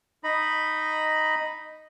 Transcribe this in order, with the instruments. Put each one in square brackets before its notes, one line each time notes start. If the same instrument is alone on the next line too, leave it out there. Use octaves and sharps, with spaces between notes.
[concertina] D#4 D#5 B5